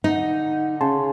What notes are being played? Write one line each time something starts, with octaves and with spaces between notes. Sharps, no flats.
D3 D#4
C#3 A5 C6